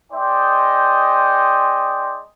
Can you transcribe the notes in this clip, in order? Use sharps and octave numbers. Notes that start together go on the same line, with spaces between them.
G#3 D#4 C5 D5 D#5 G5